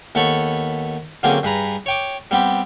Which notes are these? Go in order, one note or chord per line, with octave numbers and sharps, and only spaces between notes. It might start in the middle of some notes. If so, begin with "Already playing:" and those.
D#2 B3 A4 C#5 B5 C#6
D3 F#3 A#3 C4 C#4 G#4
G2 G#4 B4 A#5
C#5 G5 D6
G3 B3 C4 G4